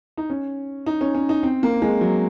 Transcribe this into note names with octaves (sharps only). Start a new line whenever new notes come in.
D#4
C#4
D#4
C#4
C#4
D#4
C4
A#3
G#3
F#3